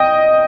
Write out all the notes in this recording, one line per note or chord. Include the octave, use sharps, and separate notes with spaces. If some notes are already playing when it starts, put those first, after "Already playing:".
Already playing: D#5 G5